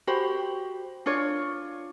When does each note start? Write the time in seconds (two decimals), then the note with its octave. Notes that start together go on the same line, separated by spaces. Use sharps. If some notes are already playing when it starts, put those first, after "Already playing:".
0.07 F#4 G4 C5 B5
1.06 D4 F4 C#5